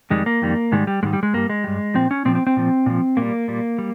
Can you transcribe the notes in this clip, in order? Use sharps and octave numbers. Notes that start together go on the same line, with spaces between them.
F2 D#3 G3 G#3
A#3
F2 D#3 G3
G#2 D#3 G3 G#3
G3
G#2 D#3 G3 G#3
G3
G#3
G2 G3 A#3
G#3
G2 G3
A#2 F3 C4
C#4
A#2 F3 C4
C4
C4
A#2 F3
A#2 F3
A#2 G3 A#3
A#2 G3
G3